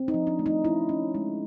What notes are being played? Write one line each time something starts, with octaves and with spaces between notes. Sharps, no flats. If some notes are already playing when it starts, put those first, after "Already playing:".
Already playing: C4
D#4
F3
D4
A3
D#4
C#4 E4
C#4
G#3